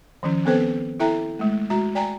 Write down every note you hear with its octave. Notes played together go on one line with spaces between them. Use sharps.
D#3 F3 C#4
B3 C4 A4 B4 C5 G5
E4 A4 E5 G5 A#5
G#3 A3
G#3 F#4 A#5
D5 G5 G#5 A#5